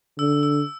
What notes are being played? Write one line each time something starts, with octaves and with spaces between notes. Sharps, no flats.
D3 E6
E6